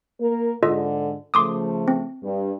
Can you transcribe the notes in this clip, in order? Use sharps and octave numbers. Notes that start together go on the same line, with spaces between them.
A#3 A#4
G#2 D3 F4 A4 D#5
C#3 F3 A3 C6 D6 D#6
C4
G2